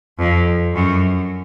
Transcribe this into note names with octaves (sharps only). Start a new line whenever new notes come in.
F2
F#2